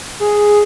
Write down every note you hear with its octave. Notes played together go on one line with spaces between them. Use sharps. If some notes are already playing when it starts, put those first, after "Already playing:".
G#4